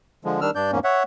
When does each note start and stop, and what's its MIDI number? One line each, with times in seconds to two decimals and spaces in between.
0.24 0.41 50
0.24 0.41 53
0.24 0.41 56
0.41 0.51 51
0.41 0.51 55
0.41 0.51 62
0.41 0.51 88
0.41 0.51 89
0.55 0.71 43
0.55 0.71 62
0.55 0.71 74
0.55 0.71 91
0.72 0.79 40
0.72 0.79 44
0.72 0.79 58
0.72 0.79 61
0.84 1.03 73
0.84 1.03 76
0.84 1.03 78